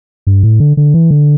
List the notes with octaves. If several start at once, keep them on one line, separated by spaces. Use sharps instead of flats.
G2
A2
D3
D3
E3
D3